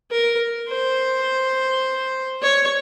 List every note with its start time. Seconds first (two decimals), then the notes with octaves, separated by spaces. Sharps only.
0.11 A#4
0.69 C5
2.42 C#5